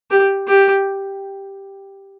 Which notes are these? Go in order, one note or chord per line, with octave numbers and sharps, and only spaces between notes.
G4
G4